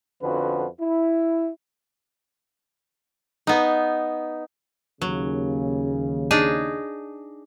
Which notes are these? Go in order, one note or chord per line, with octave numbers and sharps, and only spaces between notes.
F2 D3 F3 C#4 F#4 B4
E4
B3 D#4
D#2 C#3 F#3
D4 D#4 G#4